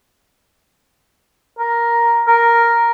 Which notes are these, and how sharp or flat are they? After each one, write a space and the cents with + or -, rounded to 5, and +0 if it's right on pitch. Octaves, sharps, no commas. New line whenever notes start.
A#4 +5
A#4 +0